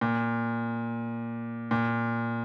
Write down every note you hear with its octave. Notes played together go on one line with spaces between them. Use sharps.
A#2
A#2